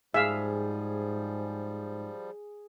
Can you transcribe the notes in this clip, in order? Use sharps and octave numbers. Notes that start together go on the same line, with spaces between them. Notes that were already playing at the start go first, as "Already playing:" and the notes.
G#2 F3 G3 G#4 E5 F5